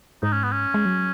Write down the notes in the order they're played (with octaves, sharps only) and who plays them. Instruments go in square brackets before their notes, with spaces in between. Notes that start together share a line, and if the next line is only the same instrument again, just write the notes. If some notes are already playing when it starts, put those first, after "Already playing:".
[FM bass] G#2 [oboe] D#4
[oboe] C#4
B3
C#4
[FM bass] G#3
F#3